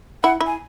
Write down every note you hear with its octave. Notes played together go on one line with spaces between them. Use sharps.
E4 F#5
E4
G#5